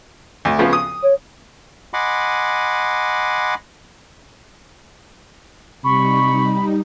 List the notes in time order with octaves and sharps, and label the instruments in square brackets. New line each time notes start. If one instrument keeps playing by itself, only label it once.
[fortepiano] D2
C#3 F3 B3
D#6
[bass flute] C#5
[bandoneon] D#5 F#5 G#5 B5 C6 D6
[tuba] C3 [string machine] G3 D#4 [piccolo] B5 [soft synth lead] C#6